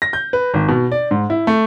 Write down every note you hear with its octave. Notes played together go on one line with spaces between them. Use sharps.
A#6
G6
B4
G#1
B2
D5
G#2
E4
A3